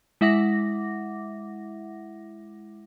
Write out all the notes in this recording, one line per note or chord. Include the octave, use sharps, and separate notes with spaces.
G#3 E4 E5 F#5 D6 A#6